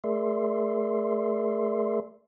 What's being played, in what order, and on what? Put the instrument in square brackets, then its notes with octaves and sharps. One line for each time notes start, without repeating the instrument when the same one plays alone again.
[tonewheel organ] A3 G#4 A#4 D5 E5 C6